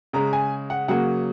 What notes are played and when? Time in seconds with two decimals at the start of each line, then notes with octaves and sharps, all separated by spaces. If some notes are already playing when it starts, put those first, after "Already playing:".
0.13 C#3 G#3 A#5
0.33 G#5
0.70 F#5
0.88 C#3 F#3 A#3 F#5